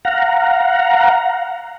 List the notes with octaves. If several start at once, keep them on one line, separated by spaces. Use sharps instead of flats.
F5 F#5 A#5